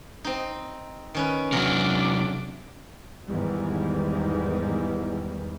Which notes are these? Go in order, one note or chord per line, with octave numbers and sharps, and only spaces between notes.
C4 D#4
D#3 C#4 B4
E2 C3 F#3 D4 A#4 D6
E2 G#2 D#3 E3 G3